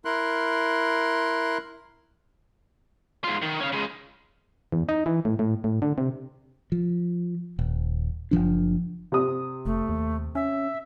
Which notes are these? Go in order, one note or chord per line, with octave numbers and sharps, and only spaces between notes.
E4 A#4 C6 F#6
G#2 F4
D#3
C#4 F5
C#3 G#3
E2
D#4
E3
A2
A2
A2
D3
C3
F3
D#1
F#1 C#2 F3 D4
C3 D#6
F1 A3
D#2
C#4 E5